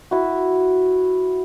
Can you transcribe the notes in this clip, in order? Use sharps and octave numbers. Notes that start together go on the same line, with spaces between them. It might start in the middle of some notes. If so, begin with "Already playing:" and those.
E4 F#4